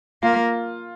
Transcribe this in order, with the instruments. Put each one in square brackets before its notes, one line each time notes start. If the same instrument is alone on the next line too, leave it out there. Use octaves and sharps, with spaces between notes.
[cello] A#3 [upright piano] F4